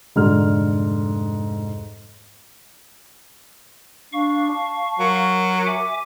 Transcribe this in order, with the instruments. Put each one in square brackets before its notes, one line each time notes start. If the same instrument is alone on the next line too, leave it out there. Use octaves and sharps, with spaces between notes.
[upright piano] F1 G#2 D3 F6
[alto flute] D4 [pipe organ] F5 C#6
[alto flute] A5
[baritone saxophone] F#3 [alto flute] A#4
[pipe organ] E5 G#5 D6